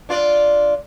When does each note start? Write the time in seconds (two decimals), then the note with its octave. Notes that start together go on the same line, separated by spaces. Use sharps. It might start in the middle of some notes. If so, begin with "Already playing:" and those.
0.09 D4 F4 D5